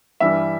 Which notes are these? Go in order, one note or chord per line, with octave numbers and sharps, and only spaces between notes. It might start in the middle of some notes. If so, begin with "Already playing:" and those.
G2 E3 G3 E5